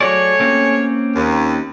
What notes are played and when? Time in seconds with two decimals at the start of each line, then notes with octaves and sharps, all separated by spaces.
0.01 F#3 A3 F#4 G#4 C#5 D5
0.40 A#3 C4 C#4
1.16 D#2